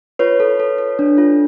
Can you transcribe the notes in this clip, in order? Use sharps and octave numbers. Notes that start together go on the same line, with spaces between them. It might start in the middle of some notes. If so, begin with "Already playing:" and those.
F4 B4 C#5
A4
A4
A4
D4
F4